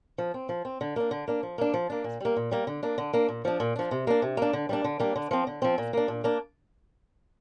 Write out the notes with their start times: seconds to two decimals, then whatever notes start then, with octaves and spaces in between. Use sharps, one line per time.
0.18 F3
0.34 C4
0.49 F3
0.65 C4
0.81 D3
0.96 A#3 D4
1.11 D3
1.28 A#3 D4
1.43 F3
1.58 A#3 D4
1.74 F3
1.90 A#3 D4
2.04 A#2
2.21 G3 A#3
2.36 A#2
2.51 G3 A#3
2.67 D3
2.83 A#3 D4
2.98 D3
3.13 A#3 D4
3.29 A#2
3.45 F3 D4
3.60 A#2
3.76 F3 D4
3.91 C3
4.07 A#3 D4
4.22 C3
4.37 A#3 D4
4.53 D3
4.69 G3 A#3 D4
4.84 D3
5.00 G3 A#3 D4
5.16 D3
5.31 F3 C4
5.47 D3
5.62 F3 C4
5.78 A#2
5.93 A#3 D4
6.08 A#2
6.24 A#3 D4